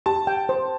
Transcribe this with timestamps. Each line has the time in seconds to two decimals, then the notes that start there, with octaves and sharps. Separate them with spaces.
0.06 G4 A5
0.27 G5
0.49 C5